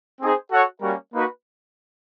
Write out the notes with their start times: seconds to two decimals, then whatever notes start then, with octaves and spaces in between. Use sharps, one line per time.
0.20 C4 D#4 G#4 C5
0.51 F#4 A4 C#5 F#5
0.82 G3 A#3 C#4 F#4 A#4
1.13 A#3 D#4 F#4 B4